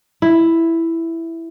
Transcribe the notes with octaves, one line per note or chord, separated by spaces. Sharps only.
E4